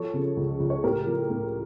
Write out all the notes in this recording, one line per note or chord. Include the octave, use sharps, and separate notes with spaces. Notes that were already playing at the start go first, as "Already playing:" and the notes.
Already playing: F3 A4 C#5
C#3
C#2
C#2
C#5
A2 G4 A#4
F3
A2